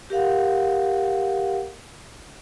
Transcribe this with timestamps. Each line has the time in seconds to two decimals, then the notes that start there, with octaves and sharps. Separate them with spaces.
0.10 G4 A#4 F5 F#5